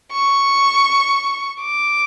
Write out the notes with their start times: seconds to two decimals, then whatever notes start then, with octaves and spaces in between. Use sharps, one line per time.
0.13 C#6
1.61 D6